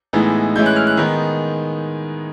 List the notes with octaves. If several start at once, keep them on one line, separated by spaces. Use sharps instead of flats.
A2 E3 G#3 B3 D#4
A2 E3 G#3 C#4 E4 G6
F#6
F6
F#6
D#3 G#3 B3 D#4